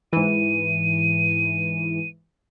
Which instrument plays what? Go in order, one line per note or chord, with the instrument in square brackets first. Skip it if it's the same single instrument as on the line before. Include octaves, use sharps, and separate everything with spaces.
[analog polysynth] G#2 E3 [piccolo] D#7